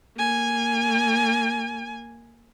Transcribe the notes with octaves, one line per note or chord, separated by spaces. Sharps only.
A#3 G#5